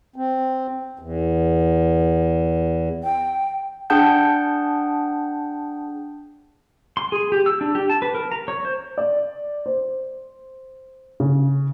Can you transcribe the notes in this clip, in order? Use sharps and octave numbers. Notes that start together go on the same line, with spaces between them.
C4
E2
G5
D4 G#4 F#5 G5 A5 G6
C6
G#4
G4
E6
D4
G4
A5
B4
A#4
A#5
C#5
C5
D5
C5
C#3